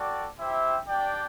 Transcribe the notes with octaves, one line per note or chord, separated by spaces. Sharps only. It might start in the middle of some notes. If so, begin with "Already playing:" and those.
Already playing: F#4 A4 D5 G5
E4 G4 C5 E5 G5
D4 G4 D5 G5